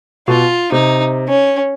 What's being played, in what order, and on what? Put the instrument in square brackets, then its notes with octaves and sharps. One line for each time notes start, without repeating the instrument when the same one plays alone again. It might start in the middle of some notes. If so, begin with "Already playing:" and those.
[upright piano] B2 [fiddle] F4
[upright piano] C3 [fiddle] D#4
[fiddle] C#4